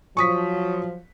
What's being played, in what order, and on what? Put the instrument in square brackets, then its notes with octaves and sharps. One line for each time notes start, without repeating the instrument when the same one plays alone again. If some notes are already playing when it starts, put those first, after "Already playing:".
[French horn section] F3 F#3 [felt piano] C#6 D#6 B6